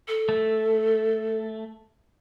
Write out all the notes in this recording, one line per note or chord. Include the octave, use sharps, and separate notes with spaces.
A4
A3